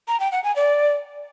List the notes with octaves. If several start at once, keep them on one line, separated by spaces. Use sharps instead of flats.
A#5
G5
F#5
G#5
D5